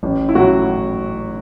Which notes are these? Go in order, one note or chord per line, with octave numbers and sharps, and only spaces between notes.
A1
E4
A2 F#3 F#4